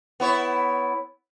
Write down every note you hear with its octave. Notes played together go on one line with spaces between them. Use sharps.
B3 E4 C#5